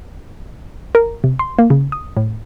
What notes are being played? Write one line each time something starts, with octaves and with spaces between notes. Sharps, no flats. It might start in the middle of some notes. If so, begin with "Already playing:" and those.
A#4
C3
C6
A#3
C#3
D#6
A2